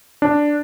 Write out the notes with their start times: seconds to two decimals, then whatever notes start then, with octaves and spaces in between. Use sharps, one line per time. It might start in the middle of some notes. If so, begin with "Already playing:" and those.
0.22 D4